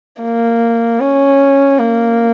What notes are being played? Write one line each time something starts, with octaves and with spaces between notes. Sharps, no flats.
A#3
C#4
A#3